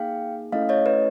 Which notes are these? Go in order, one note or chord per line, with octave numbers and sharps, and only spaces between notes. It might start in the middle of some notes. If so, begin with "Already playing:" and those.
Already playing: A#3 D#4 G#4 F5 G5
A3 C#4 E4 A4 D#5 F5
C#5 D#5
B4 C#5